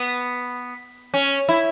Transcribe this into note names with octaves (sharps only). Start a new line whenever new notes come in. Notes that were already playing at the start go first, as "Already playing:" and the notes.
Already playing: B3
C#4
E4